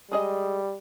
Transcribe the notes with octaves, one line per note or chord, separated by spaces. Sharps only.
G3 G#3 G#4 D#5